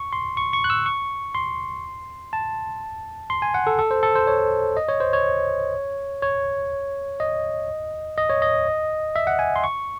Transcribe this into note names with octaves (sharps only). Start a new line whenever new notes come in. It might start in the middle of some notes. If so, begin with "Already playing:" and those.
Already playing: C#6
C6
C#6
C#6
F#6
E6
C#6
C6
A5
C6
G#5
F#5
A4
A4
C5
A4
C5
C#5
D#5
C#5
C5
C#5
C#5
D#5
D#5
C#5
D#5
E5
F#5
G#5
C6
C#6